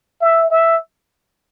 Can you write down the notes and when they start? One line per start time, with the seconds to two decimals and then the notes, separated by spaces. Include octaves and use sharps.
0.21 E5
0.51 E5